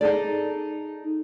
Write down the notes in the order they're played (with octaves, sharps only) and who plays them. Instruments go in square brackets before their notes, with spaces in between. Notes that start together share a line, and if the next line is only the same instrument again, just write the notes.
[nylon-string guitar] D#4 G#4 A4 D5